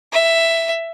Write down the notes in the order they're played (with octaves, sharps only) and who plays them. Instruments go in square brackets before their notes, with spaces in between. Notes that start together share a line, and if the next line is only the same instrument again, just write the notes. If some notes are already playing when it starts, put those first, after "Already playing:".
[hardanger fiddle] E5